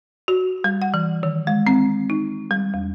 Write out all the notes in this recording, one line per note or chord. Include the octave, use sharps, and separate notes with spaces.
F#4
G3
F#5
E3
D#3
G#3
C4
D#4
G3
E2